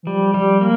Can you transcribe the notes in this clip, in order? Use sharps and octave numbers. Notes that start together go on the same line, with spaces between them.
E3
F3 G3
G3
A#3